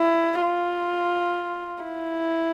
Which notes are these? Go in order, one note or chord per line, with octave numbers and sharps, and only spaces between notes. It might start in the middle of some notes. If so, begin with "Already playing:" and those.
Already playing: E4
F4
E4